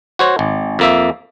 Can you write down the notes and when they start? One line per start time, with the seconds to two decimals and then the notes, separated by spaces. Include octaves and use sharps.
0.19 F#4 C5 C#5
0.39 G#1
0.79 F2 A#3 E5